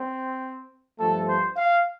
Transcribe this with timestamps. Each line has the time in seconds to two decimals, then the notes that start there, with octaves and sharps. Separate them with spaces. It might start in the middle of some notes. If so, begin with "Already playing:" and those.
Already playing: C4
0.98 G2 F3 A3 A4
1.28 C5
1.56 F5